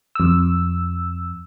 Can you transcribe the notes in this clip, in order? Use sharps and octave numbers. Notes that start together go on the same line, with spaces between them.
F2 E6